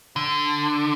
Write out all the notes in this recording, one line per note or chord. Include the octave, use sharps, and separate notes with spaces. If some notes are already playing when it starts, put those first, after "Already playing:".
D3